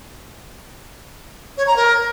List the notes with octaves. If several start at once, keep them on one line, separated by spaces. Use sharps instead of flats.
C#5
A#5
A#4